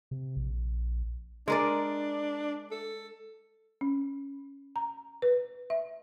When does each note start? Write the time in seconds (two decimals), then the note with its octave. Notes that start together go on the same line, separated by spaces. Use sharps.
0.11 C3
0.37 A#1
1.48 G#3 D4 A#4 D5
2.71 A4
3.81 C#4
4.76 A#5
5.22 B4
5.70 E5